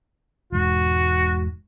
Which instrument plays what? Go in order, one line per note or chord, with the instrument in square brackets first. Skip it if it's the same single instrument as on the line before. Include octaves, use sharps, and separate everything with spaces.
[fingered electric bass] E1 G#2 [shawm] F#4